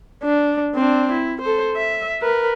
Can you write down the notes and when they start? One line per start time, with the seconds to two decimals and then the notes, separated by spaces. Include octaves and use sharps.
0.23 D4
0.75 C4 D4
1.12 E4
1.42 A4 C5
1.76 E5
2.21 A#4 B4